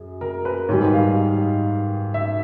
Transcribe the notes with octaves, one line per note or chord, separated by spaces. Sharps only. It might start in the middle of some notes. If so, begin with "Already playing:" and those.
Already playing: F#2 G#4
A#4
B4
G#2 D#3 G3 C#5
F5
E5